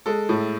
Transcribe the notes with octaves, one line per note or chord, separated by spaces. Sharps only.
G#3 A4
A2